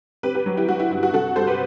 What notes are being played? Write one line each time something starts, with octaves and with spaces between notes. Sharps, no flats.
C4 G4 B4
G4 B4
F#3
E4 G4
F#3 F#4
E4
G2 E4
F#4
C3 F#4 A4
G3 A4 C5
G4 B4